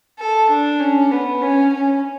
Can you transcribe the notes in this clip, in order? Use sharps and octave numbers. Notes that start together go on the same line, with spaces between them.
A4
D4
C#4
B3
C#4
C#4